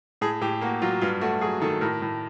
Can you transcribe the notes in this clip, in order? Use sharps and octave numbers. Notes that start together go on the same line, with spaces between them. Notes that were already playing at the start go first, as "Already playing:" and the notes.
A2 G#4
A2 G4
A#3 F#4
F#3 F4
G2 F4
A3 F#4
F#3 G#4
D#3 A4
A2 A#4
A2